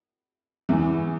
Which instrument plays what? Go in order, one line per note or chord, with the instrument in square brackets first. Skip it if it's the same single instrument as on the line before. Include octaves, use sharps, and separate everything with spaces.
[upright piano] E2 E3